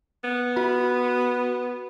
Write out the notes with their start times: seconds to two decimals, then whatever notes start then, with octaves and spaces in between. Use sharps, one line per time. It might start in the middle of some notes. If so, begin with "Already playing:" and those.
0.24 B3
0.57 F#4 B5